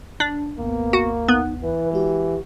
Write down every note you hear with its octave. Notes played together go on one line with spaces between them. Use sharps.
D4
G#1 D#2 A#3 B3
F#4
B3 D#4
E3 B4
G#3 F#4 G4